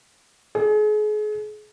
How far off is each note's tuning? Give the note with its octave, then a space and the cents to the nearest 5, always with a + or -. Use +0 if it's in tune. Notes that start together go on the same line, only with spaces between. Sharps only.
G#4 +35